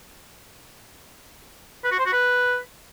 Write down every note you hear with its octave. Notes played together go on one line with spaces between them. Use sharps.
B4
F#4
C5
F#4
B4